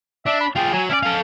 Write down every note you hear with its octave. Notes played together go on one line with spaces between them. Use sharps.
D4 E5
B5
F4 G#4 G5
F#3 G#5
C#4 E4 D5
A4 F5